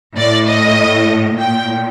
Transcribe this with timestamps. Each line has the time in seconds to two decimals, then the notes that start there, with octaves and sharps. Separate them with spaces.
0.17 A2 D5
0.47 D#5
1.39 A#2 G5